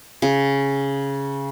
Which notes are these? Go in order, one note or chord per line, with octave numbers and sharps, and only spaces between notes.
C#3